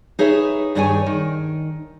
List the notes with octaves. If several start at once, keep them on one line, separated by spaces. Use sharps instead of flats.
D#4 G#4 B4 C#5 E5
G2 D#3 D4 G#4 C#5 G#5
D#3